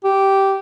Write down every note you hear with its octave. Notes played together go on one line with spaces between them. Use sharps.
G4